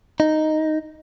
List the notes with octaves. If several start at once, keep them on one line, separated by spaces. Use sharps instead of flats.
D#4